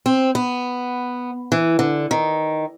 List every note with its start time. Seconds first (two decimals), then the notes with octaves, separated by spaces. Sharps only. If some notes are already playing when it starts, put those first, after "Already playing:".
0.06 C4
0.35 B3
1.52 E3
1.79 D3
2.11 D#3